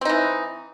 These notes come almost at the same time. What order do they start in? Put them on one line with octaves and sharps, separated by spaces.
C4 D#4 E3